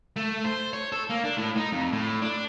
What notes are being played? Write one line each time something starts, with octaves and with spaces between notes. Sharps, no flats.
A3
C5
C#5
A4
A#3
D4
A2
D#4
F2
A2
D4